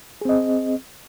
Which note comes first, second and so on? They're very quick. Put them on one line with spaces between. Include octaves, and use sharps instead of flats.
G#4 C4 D#5